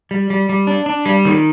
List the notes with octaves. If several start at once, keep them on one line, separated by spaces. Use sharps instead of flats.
G3
G3
G3
D4
D4
G3
D#3